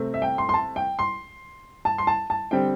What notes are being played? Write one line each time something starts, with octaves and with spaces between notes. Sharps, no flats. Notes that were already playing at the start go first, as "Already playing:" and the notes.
Already playing: C3 A3 C4
E5
G5
C6
C6
A5
G5
C6
A5
C6
A5
A5
D3 G3 C4 G5